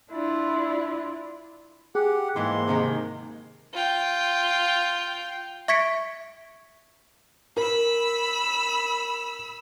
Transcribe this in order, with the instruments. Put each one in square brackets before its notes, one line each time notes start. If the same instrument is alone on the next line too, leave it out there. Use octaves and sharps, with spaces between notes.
[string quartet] D4 E4 F4 D5
[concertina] G4 F#5 [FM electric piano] G#4
[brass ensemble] G#2 A#3 [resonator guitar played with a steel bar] E3 G#3 [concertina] C6
[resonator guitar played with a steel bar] C3 D#3 G#3
[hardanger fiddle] F4 G5
[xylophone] E5 C#6 G#6 B6 C#7 D7
[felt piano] A#4 [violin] B5 E6